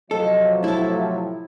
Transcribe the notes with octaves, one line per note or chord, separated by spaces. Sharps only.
C3 F3 F#3 A4 D#5
A2 E4 A4